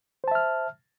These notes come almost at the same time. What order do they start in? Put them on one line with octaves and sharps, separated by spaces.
C5 A5 E5 F6